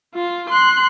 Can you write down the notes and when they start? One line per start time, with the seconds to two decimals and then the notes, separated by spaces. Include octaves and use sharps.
0.15 F4
0.50 C6 F#6